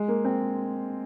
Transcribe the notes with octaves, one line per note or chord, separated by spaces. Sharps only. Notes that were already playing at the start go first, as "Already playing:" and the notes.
Already playing: G#3
A#3
C4